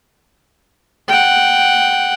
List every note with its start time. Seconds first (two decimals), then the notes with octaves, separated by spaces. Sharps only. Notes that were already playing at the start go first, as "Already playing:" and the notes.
1.08 F#5 G5